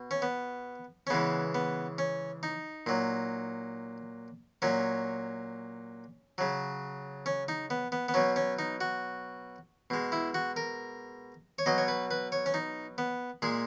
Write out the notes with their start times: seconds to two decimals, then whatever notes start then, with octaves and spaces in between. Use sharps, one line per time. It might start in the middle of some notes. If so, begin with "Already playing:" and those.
Already playing: B2
0.11 C#4
0.22 B3
1.07 C#4
1.10 C#3 E3 G#3 B3
1.55 B3
1.98 C#4
2.43 D#4
2.87 A#2 F#3
4.62 A#2 F#3 C#4
6.38 C#3 F#3
7.26 C#4
7.48 D#4
7.70 B3
7.92 B3
8.09 B3
8.14 B2 F#3 C#4
8.36 C#4
8.59 D#4
8.81 F#4
9.90 B2 G#3
10.12 E4
10.34 F#4
10.57 A#4
11.59 C#5
11.66 B2 F#3 D#5
11.78 C#5
11.88 B4
12.11 B4
12.32 C#5
12.46 C#4
12.54 D#4
12.98 B3
13.42 A#2 G#3 G#4